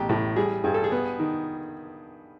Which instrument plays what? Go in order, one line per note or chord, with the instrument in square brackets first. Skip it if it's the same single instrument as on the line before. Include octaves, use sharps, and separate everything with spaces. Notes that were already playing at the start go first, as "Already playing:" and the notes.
Already playing: [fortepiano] A1 B2 G4
A2
G3 G#4
G2 G#4
A4
G#4
B3
D#3